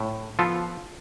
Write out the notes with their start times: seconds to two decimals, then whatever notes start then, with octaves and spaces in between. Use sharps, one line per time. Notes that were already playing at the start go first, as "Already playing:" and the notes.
Already playing: A2
0.39 F3 B3 F4 A4